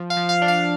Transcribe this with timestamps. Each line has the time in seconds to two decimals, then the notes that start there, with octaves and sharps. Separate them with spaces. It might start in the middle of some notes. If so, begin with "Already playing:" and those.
Already playing: F3
0.10 F5
0.17 F3
0.29 F5
0.42 D4
0.48 F5